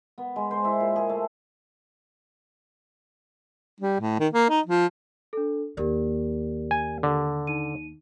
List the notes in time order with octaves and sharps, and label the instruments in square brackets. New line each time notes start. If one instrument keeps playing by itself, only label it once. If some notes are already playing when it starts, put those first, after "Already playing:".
[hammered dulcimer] B3
G#3
C5
E4
A#2
G#4
A3
[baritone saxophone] G3
A2
D#3
A#3
D#4
F3
[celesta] D4 A4
[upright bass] D#2 A#3 [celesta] G4 A#4 D5
[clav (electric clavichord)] G#5
D3
[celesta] D#4 D#7